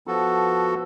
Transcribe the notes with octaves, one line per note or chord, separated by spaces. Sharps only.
F3 B3 F#4 A4